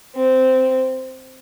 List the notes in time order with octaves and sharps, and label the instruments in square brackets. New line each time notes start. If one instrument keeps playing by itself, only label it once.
[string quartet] C4